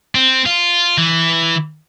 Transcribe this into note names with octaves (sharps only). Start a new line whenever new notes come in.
C4
F4
E3